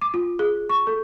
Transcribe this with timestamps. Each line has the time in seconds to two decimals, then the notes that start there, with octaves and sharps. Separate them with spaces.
0.01 D6
0.14 F4
0.39 G#4
0.69 C#6
0.87 A4